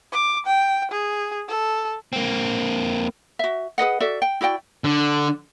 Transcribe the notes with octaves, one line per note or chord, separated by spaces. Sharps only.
D6
G5
G#4
A4
A#3 C4
F#4 E5
G#4 B4 D#5 F#5
F#4 A4 D5 E5
G5
E4 F#4 D5 G5
D3